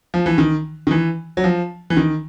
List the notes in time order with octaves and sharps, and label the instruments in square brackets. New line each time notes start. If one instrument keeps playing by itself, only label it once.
[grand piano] F3
E3
D#3
D#3
E3
F#3
F3
E3
D#3